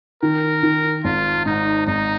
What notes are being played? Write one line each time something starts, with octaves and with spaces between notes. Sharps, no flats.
D#3 A#4
D#3
G#1 F4
G#2 D#4
G#1 D#4